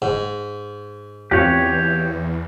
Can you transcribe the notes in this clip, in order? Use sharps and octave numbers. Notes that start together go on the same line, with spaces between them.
G#2
E2 C4 F4 G4 C#5 F5 F#6